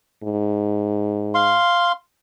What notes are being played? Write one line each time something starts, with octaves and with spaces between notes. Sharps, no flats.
G#2
F5 C6